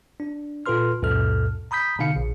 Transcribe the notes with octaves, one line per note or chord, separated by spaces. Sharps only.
D4
A#2 F4 A4 B4 C6 F6
C#2 F#2 A#2 A4 F6
A#5 B5 D#6 G6 B6
B2 D3 D#4 F5 C#7
A#1